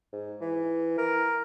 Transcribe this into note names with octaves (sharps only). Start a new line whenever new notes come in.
G#2
E3
A#4